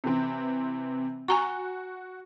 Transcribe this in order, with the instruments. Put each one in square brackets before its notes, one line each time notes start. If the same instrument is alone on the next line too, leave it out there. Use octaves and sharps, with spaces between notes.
[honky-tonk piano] C3 E3 C4
[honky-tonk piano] F#4 [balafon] G#5 A#5 C#6